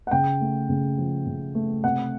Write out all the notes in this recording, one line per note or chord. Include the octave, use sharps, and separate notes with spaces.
F#5
C#3 G5
A3
C#3
F3
C#3
A3
C3 F#5